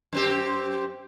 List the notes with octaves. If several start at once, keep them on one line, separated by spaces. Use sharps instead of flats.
F#2 C4 G4